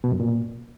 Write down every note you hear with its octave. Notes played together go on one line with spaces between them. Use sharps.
B2
F#2
A#2